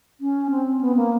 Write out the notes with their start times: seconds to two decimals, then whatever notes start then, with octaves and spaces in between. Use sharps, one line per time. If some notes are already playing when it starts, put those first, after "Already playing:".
0.21 C#4
0.51 C4
0.81 B3
0.96 A#3